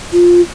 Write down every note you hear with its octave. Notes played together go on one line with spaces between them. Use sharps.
F4